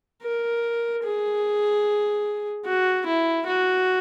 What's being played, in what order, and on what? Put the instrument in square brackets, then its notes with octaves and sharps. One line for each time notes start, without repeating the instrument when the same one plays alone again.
[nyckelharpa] A#4
G#4
F#4
E4
F#4